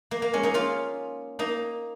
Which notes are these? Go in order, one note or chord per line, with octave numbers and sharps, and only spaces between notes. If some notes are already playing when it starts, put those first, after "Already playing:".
A#3
A#3
G#3 C#4
A#3 D#4
C#4 F4
A#3 D#4